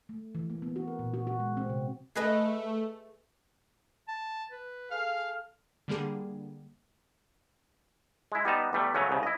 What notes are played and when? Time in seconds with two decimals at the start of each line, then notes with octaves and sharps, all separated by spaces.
0.09 A3
0.35 E3
0.50 A#3
0.62 B3
0.76 F#4
0.88 A#4
0.99 A#2
1.14 F#4
1.27 F#4
1.40 G#3
1.57 C4
1.69 C3
2.15 A3 G#4 B4 D#5
4.08 A5
4.51 B4
4.91 G#4 A4 F5 F6
5.88 D3 G3 A#3 G#4
8.32 G#3 E4
8.45 G3 B3 D#4 A5
8.73 E2 G3 A3
8.94 C#3 F#3 A3 C#4
9.09 C2 C#3
9.23 E4 D#5